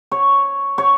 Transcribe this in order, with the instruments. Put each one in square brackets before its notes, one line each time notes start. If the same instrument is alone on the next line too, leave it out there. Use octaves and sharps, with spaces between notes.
[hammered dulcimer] C#5
C#5